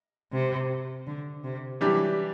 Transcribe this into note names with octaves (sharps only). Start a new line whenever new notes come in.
C3
D3
C3
E3 F#3 G3 D4 G4